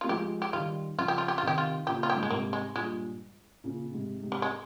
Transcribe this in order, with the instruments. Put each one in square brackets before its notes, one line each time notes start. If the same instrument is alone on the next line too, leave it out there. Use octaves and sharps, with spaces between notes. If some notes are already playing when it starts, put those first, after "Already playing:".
[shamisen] F4
[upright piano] A#3
[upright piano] F3 G#3 [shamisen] G4
[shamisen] G4
[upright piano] D#3 G3 [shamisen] F4
[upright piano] C#3 F3 [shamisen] F4
[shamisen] G4
F4
G4
F4
[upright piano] C3 D#3 [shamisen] G4
[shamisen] F4
[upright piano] A#2 C#3 [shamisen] G4
[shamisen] F4
[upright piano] G2 [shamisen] G4
[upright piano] G#2
[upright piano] A#2 [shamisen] G#3
[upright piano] G#2 C3 [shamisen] A#3
[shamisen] G#3
[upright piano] G2 A#2 [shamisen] G#3
[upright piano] A#2 C#3
G#2 C3
G#2 C3
[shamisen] G3
G#3